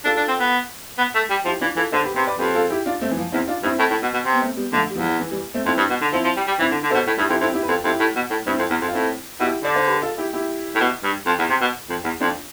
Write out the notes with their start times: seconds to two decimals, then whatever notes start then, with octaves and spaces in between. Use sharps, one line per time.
0.05 D4 F4 A4
0.17 D4
0.28 C4
0.40 B3
0.98 B3
1.15 A3
1.30 G3
1.45 F3 E4 G4
1.61 E3 D4 F4
1.76 E3 F4 A4
1.92 D3 A4 C5
2.04 G4 B4
2.15 C3 G4 B4
2.27 B4 D5
2.39 F2 G4 B4
2.55 F4 A4
2.70 E4 G4
2.86 D4 F4
3.01 A3 C4
3.10 E3
3.17 F3
3.32 E2 C4 E4
3.48 D4 F4
3.63 G2 C4 E4
3.79 A2
3.91 A2
4.02 B2
4.14 B2
4.25 C3
4.32 B3
4.42 A3 C4
4.57 G3 B3
4.73 D3 F3 A3
4.90 G3
4.96 E2 F3
5.19 E3
5.31 E3 G3
5.54 A3 C4
5.66 F2 C4 E4
5.78 G2
5.90 B2
6.02 D3
6.12 F3 C4 E4
6.25 F3
6.36 G3
6.47 G3
6.59 E3 C4 E4
6.71 D3
6.83 D3
6.90 A4 C5
6.94 B2
7.07 A2
7.18 G2 E4 G4
7.29 F2 E4 G4
7.41 F2 C4 E4
7.53 E4 G4
7.62 B4
7.68 F2 F4 A4
7.84 F2 E4 G4
8.00 A2
8.16 B2
8.31 A2
8.46 G2 C4 E4
8.59 F2
8.70 E2
8.81 F2
8.87 F4
8.93 A2 C4 E4
9.40 B2 E4 G4
9.63 D3 D5
9.75 C5
9.86 G4 B4
10.02 F4 A4
10.18 E4 G4
10.33 E4 G4
10.75 A2
10.81 B2
11.04 G2
11.26 F2
11.39 E2
11.50 C3
11.61 B2
11.90 F2
12.04 E2
12.20 F2 D4 F4